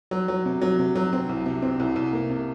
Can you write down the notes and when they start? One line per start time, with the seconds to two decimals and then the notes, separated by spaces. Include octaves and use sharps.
0.11 F#3
0.28 F#3
0.45 C3
0.62 F#3
0.79 C3
0.95 F#3
1.13 C4
1.29 C2
1.46 C3
1.62 C4
1.80 C2
1.96 C2
2.13 A#3
2.30 C3